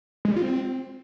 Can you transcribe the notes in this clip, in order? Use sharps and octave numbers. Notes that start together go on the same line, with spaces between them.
G#3
G3
F4
C4